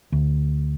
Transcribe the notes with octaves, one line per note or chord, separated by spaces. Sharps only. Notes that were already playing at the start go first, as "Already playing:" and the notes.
D2